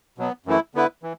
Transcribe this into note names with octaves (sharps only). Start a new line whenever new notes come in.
B2 F#3 B3
F#2 E3 A3 E4
D3 B3 E4 B4
E3